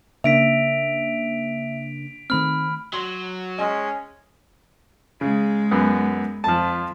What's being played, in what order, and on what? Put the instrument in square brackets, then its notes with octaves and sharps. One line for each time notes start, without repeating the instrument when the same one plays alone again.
[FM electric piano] C#3 A#3 D4 [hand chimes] E5 [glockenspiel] B6 D7 F7
[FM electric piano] D#3 A3 C4 [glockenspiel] B5 F6
[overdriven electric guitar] F#3 [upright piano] C6
[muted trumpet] G#3 [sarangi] C#4 [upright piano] D#5
[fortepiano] C#3 [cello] G#3
[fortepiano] F#2 B3
[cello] F2 [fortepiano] F3 A5